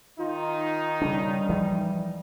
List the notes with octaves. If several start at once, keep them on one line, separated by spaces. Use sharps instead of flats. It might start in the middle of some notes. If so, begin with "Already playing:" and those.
D#3 D#4 F4
C#3 G3 D4
E3 F3